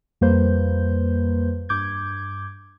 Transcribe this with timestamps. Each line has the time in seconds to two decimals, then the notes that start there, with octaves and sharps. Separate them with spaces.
0.21 F2 G3 A#3 B4 C5 G6
1.69 G2 D6 G6 G#6